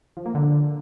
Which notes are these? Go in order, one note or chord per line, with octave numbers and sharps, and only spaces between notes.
F3
A#3
D3